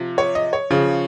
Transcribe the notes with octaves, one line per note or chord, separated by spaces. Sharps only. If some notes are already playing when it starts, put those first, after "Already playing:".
Already playing: C3 F3
C#5
D#5
C#5
C#3 F3